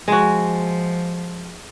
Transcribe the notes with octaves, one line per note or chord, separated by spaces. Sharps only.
F3 G#3 F#4